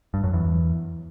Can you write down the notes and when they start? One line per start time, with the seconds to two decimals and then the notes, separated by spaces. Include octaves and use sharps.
0.14 G2
0.24 F#2
0.33 E2